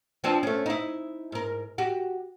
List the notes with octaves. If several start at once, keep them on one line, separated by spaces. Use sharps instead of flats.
F3 C4 D4
A3 C#4
D#4 E4
G#2 A#4
F#4 G4